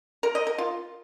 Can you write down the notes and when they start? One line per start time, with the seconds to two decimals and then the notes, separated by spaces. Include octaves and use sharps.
0.23 A#4
0.35 D#5
0.47 A#4
0.58 F4